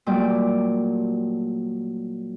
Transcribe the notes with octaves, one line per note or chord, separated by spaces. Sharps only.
A#2 F#3 G3 A3 D5 G5